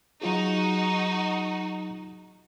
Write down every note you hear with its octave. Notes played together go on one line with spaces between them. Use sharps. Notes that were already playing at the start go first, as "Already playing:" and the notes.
F#3 D#4 F4 F#4 G#4